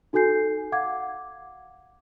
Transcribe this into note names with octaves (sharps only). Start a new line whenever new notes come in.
D#4 F#4 A4 G#5 G6 C7
F5 F#5 D6 G#6